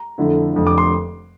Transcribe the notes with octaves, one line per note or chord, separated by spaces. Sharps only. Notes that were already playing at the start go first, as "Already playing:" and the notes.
Already playing: A#5
F2 D3 A3 E4
F1 F2 D3
D6
C6